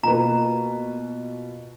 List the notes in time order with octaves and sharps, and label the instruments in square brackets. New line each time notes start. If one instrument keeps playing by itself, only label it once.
[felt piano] B2 A#3 F4 B4 [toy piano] A#5